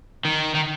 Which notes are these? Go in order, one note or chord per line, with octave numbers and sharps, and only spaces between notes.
D#3
D#3